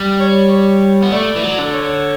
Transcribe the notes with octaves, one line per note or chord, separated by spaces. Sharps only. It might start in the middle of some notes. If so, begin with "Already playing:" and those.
Already playing: G3
C#5
C#5
B3
A3 D5
E3
F#3
D3
C#5